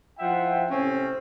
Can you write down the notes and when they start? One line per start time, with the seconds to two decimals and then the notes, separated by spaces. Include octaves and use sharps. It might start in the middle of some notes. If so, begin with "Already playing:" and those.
0.19 F3 E4 F4 E5 F#5 G5
0.69 A2 C3 C4 C#4